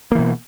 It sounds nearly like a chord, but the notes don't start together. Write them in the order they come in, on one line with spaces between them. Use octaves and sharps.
A#3 E3 B2